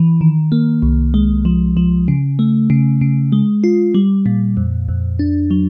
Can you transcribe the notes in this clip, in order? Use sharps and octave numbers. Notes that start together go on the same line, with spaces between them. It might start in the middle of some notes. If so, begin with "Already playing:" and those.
Already playing: E3
D#3
A#3
C2
G#3
F3
F3
C#3
A3
C#3
C#3
G#3
F4
G3
A#2
F2
F2
D4
F#3